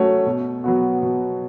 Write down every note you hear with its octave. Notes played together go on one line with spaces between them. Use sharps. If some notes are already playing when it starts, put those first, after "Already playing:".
Already playing: F#3 A3 C#4 F#4 C#5
B2
F#3 B3 F#4
B2